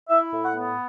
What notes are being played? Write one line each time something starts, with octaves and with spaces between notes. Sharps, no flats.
E4 E5
A2
F#5
B3